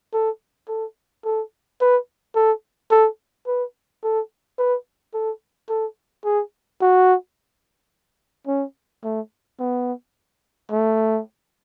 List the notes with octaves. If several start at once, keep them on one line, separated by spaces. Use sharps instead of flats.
A4
A4
A4
B4
A4
A4
B4
A4
B4
A4
A4
G#4
F#4
C#4
A3
B3
A3